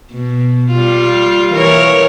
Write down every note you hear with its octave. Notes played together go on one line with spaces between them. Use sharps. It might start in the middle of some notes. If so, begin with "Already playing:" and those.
B2
G3 F4
E3 A#4 C#5